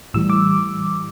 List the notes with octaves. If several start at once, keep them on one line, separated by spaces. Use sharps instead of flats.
A2 E3 G3 E6
D6